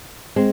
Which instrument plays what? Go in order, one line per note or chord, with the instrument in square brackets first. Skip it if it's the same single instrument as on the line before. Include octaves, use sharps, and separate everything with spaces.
[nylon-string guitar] G#3 C4